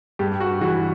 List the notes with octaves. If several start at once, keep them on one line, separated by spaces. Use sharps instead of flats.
G2 G4
F#4
E3 F#4